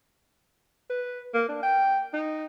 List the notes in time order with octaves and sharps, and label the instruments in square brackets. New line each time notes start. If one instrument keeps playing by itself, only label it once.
[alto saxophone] B4
A#3
D4
G5
D#4